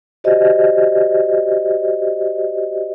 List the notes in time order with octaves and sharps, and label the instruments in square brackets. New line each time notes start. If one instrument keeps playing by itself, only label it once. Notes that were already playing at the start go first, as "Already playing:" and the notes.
[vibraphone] F#4 G4 C5 D5 D#5